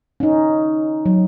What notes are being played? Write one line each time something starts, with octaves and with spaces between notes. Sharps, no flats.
C#4 D#4
F#3